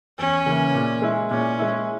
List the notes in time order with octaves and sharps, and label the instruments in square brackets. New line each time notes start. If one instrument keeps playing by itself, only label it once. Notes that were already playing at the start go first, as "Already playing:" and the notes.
[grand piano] E2 [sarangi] C#4
[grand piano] C#3 E3 A#3 E4
A#2
G#3 E4
[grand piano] A#2 [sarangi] C#4
[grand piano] G#3 E4